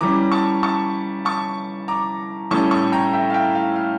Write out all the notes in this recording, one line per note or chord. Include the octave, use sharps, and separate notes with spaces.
E3 G3 C#4 A#5 D6
A5 C#6
A5 C#6
A5 C#6
A#5 D6
A2 G3 C#4 A5 C#6
A5 C#6
G5 A#5
E5 G5
F5
E5 G5
F5
F5